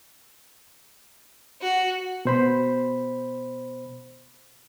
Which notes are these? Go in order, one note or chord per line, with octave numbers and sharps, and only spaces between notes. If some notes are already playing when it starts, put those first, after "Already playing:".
F#4
B2 C5 B5